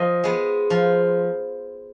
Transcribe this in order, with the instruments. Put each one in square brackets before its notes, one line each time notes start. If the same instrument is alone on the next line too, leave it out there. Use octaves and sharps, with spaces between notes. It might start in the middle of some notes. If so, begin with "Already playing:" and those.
Already playing: [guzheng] F3 D#5
G#3 B3
F3